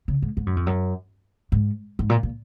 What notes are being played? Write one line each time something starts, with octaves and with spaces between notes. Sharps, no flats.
C#3
G#2
G#2
F#2
F2
F#2
G#2
G#2
A#2
A#2